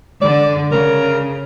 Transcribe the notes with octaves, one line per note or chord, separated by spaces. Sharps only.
D3 D5
C#3 A#4